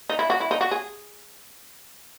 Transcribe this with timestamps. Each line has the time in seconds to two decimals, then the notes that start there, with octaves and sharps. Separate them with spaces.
0.09 D#4
0.19 E4
0.30 F#4
0.40 E4
0.51 D#4
0.61 F#4
0.71 G#4